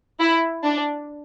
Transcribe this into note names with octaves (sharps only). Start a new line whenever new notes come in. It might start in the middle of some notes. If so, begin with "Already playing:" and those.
E4
D4